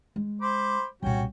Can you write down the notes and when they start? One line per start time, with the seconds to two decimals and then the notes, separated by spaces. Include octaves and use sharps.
0.16 G#3
0.42 C5 B5 D6
1.03 C2 A#2 C#4 F#4 G5